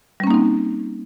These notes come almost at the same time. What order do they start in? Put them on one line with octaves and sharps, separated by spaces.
G3 C#4 A#3 D#4 C4